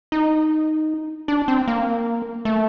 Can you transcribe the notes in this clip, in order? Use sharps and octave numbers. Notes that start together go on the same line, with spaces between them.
D#4
D4
C4
A#3
A3